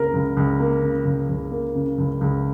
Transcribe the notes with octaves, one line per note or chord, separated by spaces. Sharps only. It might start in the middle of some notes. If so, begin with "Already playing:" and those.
Already playing: C#2 C#3 A#3 A#4
C#2
C#2
A#3
C#3
C#2
C#2
A#3
C#3
C#2
C#2